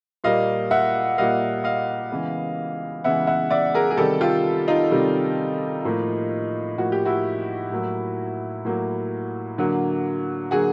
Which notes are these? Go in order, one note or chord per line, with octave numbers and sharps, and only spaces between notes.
A#2 G3 A#3 D#5 F5
E5 F#5
A#2 G3 A#3 D#5 F5
D#5 F5
C#3 E3 G#3 B3
C#3 E3 G#3 B3 E5 F#5
E5 F#5
D5 E5
G#4 A#4
G#4
C3 D#3 G3 G4 A4
F4 G4
D#4 F4
C3 D#3 G3
A2 F3 A#3
A2 F3 A#3 F#4
G4
E4 F#4
A2 F#3 A#3
A2 F#3 A#3
D3 F#3 A#3
D3 F#3 A#3 F#4 G#4